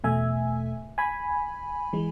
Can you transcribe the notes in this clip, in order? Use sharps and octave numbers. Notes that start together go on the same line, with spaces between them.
E2 B2 A3 E5 G#5
G#5 B5
E3 G#3